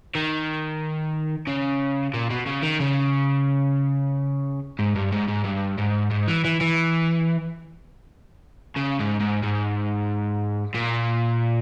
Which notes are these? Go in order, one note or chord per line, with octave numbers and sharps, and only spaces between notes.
D#3
C#3
A#2
B2
C#3
D#3
C#3
G#2
G2
G#2
G#2
G2
G#2
G#2
E3
E3
E3
C#3
G#2
G#2
G#2
A#2